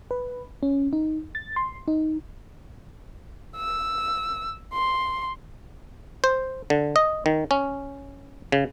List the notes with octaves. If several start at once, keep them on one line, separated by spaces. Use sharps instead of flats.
B4
C#4
D#4
A6
C6
D#4
E6
C6
C5
D3
D#5
D#3
C#4
C#3